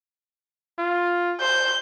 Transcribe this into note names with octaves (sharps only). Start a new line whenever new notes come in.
F4
C5 G6